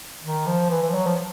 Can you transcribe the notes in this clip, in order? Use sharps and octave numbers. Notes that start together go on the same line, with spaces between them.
D#3
F3
E3
E3
F3
F#3
F3